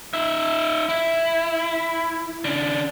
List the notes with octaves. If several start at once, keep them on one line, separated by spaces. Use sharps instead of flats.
D#4 E5
E4
C#3 D4